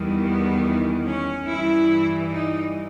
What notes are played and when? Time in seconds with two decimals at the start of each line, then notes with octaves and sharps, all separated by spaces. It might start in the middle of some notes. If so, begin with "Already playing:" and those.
Already playing: E2 D#3 G3
0.24 B3
1.06 C#4
1.47 G2 E3 G3 E4
2.30 D#4